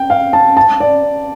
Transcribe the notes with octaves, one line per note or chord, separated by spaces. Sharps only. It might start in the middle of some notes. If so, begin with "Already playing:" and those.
Already playing: G5
F5
A5
A5
D5